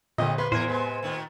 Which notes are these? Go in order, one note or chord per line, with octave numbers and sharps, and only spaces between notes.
A#1 A#2 D3 C4 D#5
A#3 B4 C6
E2 A2 E3 A#4 C5 G#5
C3 G#3 B3
A#2 D#3 A3